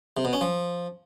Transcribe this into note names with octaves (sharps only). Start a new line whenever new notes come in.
C3
B2
C#4
F3